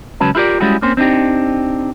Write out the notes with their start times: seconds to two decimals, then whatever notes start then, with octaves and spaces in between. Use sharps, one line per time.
0.20 C#2 F#3 C#4 B4 A5
0.35 E4 F4 G4 A#4 D5
0.60 G3 G#3 C#4 E4 F#4 G#4
0.82 A#3 C4 C#4 C5
0.97 C4 D4 D#4 G4